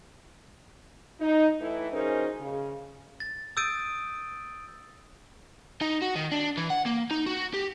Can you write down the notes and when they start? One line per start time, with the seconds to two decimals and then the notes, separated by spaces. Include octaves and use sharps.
1.21 D#4
1.61 A2 E3 E4
1.92 F#3 C#4 D#4 G#4 A#4 C5
2.40 C#3
3.20 A6
3.57 D#6 E6 G6 A6 D7 D#7
5.81 D#4
6.02 F#4
6.15 D#3
6.31 D4
6.57 E3
6.70 F#5
6.86 A#3
7.11 D#4
7.26 F#4
7.54 G4